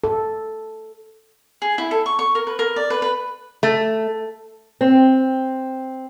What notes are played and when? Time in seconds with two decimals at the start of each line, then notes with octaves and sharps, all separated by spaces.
0.04 A4
1.62 G#4
1.78 E4
1.91 A4
2.06 C#6
2.19 C#6
2.35 A#4
2.47 B4
2.59 A#4
2.76 D5
2.90 B4
3.02 B4
3.63 A3
4.81 C4